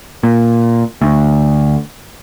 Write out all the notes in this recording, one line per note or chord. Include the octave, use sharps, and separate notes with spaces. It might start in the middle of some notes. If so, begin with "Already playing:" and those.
A#2
D2